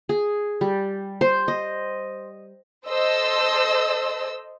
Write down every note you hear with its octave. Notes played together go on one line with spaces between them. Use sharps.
G#4
G3
C5
D#5
A4 C5 D#5 E6